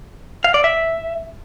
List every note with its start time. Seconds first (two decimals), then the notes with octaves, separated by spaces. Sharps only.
0.44 F5
0.54 D5
0.64 E5